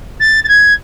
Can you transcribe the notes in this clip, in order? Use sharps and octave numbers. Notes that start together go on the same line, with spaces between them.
A6
A6
G#6